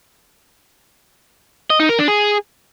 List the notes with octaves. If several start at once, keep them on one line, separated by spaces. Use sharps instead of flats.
D#5
D#4
A#4
D4
G#4